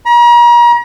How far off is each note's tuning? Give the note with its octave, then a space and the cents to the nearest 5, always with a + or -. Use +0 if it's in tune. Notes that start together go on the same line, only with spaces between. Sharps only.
A#5 +40